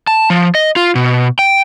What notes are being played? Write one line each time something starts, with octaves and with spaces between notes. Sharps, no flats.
A5
F3
D#5
F4
B2
G5